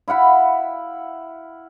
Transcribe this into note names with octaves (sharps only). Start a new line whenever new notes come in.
E4 F5 F#5 B5